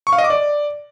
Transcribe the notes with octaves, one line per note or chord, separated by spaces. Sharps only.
C#6
F5
D#5
D6
D5